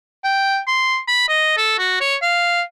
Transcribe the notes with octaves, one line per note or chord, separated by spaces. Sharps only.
G5
C6
B5
D#5
A4
F#4
C#5
F5